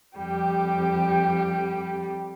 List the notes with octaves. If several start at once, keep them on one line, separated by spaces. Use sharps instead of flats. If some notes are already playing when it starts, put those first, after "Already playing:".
F2 G3 G4